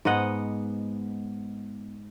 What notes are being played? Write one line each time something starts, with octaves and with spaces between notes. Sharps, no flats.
G#2 B3 D#5 F#5